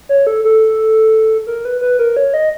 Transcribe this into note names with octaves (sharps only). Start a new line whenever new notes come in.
C#5
A4
A4
A#4
B4
B4
A#4
C#5
D#5